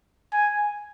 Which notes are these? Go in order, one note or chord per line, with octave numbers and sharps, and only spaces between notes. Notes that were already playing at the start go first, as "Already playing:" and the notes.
G#5